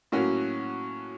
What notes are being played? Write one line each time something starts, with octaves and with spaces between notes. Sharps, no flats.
A2 F#3 A#3 C#4 F#4